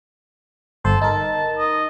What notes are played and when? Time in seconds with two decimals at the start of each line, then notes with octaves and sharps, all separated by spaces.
0.85 G1 A4 C5
1.02 D#4 A#4 A5
1.58 D#5